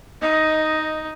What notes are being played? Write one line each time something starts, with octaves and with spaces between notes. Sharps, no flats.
D#4 D#5